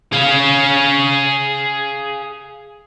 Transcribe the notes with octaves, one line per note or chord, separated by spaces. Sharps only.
G#4 F5